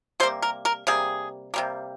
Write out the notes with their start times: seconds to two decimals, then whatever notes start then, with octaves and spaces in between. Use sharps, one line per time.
0.20 C3 G3 A#3 C5
0.42 A#4
0.65 A#4
0.87 C3 G3 A#3 G#4
1.54 C3 G3 A#3